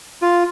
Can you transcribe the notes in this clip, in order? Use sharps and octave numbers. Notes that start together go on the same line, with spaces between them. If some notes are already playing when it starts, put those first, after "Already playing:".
F4